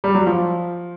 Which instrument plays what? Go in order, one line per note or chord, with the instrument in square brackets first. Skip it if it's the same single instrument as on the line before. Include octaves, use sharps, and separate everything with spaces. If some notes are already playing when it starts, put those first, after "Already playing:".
[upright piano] G3
F#3
F3